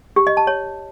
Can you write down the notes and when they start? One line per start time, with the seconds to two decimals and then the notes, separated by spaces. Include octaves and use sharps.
0.16 G4
0.27 D#5
0.37 A5
0.47 C#5